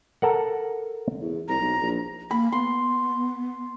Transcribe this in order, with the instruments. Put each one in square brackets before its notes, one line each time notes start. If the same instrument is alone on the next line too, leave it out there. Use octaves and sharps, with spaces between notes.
[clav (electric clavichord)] A4 A#4 F#5
[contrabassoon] E2
[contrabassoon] C2 [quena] A#5
[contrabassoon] B1
A#1
[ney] A#3 [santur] B5
[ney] B3 [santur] C6